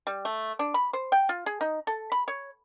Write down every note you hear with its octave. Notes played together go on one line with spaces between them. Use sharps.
G3
A3
D4
B5
C5
G5
F4
G#4
D#4
A4
B5
C#5